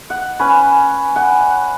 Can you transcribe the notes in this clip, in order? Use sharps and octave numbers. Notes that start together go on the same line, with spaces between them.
F#5
C#4 B4
F#5